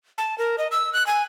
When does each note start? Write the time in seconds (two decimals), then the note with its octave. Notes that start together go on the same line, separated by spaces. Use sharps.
0.18 A5
0.38 A#4
0.58 D#5
0.71 E6
0.93 F#6
1.07 G#5